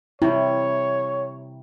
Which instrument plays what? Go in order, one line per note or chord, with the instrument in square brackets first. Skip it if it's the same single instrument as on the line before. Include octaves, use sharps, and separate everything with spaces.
[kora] C3 G3 [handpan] E4 [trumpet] C#5